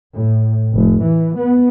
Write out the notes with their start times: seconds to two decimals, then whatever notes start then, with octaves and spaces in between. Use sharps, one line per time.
0.13 A2
0.72 F1
1.03 E3
1.38 B3